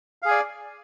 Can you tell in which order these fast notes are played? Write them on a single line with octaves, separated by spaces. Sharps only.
F5 G#4 G#5 D5